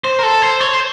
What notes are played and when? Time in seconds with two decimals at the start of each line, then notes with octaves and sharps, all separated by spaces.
0.04 C5
0.19 A#4
0.23 A4
0.42 C5
0.60 C#5
0.73 C5